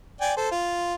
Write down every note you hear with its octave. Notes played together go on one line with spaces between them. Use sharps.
D5 G5 G#5
A4 C5
F4